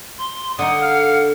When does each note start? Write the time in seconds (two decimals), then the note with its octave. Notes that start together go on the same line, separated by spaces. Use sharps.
0.18 C6
0.59 D3 D#4 F#5 D#6
0.82 F5